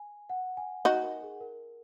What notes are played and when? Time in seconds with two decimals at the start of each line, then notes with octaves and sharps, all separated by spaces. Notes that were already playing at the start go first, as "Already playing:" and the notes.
Already playing: G#5
0.30 F#5
0.57 G#5
0.85 D#4 F#4 F#5
1.03 A#4
1.23 G#4
1.41 A#4